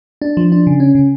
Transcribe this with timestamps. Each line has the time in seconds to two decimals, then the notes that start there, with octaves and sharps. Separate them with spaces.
0.22 D4
0.37 F3
0.52 D4
0.67 C#3
0.80 C#4
0.95 C#3